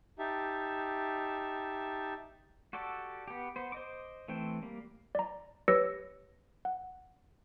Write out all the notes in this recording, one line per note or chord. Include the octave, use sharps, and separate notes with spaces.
D#4 G4 E5 A5
F#4 G4 A4 D5
B3 G4
B3 C5
C5 D#5 D6
E3 A3 C4 G5
G3 A#3
D5 A#5
G4 B4 C#5 E6 A#6 C#7
F#5